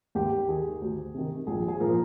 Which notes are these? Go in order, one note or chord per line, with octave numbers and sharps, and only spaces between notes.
D#2 G4
D#3 G#4
D2
C3 D#3
A#1 G#4
G#4
A#2 F3 A#4